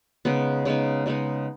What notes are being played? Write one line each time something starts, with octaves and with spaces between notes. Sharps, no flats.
C#3 G#3 B3 D#4
C#3 G#3 B3 D#4
C#3 G#3 B3 D#4